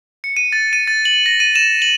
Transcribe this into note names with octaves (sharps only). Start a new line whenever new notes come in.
C#7
D#7
A6
D#7
A6
F#7
A#6
D#7
E7
F#7